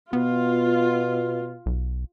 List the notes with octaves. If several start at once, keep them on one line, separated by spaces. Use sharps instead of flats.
B2 B3 F4
B1